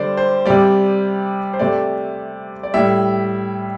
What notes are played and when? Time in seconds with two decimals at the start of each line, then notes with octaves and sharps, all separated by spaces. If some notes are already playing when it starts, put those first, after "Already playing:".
Already playing: D3 G3 C5 D5
0.17 C5
0.46 C3 G3 D5
1.53 C5
1.59 C3 A3 D5
2.63 D5
2.74 A2 G3 E4 E5